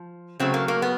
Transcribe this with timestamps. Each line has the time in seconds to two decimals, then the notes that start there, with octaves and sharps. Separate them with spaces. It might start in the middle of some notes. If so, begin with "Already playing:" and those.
Already playing: F3
0.40 C#3 F#3 A3 C4
0.54 A#3
0.68 A#3
0.82 B3